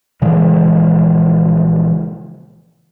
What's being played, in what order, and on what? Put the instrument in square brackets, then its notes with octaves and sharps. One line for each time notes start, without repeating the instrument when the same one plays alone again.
[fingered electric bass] A#1 C#3 E3 G#3